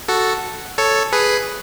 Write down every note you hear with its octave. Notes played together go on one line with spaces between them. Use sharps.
F#4 A4
A4 C#5
G#4 B4